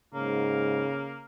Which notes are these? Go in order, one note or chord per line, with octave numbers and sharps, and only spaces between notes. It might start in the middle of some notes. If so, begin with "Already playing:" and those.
G#2 C#3 A#3